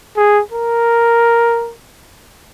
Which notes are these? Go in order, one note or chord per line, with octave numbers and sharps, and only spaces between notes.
G#4
A#4